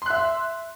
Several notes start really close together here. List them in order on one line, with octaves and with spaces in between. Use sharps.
C6 F#6 E5